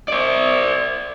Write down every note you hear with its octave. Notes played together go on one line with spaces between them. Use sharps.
C5 D5